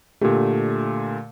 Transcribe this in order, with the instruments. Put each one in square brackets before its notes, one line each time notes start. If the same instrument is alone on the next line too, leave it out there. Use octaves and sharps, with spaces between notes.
[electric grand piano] A#2 D3 A3 [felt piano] G4